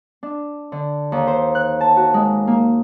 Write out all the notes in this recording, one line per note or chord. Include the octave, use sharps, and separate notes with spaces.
D4
D3
D#2
C5
F#6
A5
F#4
G#3
A#3